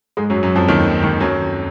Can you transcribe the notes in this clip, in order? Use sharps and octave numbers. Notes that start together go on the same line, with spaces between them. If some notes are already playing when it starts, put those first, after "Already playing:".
G#2 G#3
F#2 F#3
F#2 F#3
F2 F3
D#2 D#3
D#2 D#3
F#2 F#3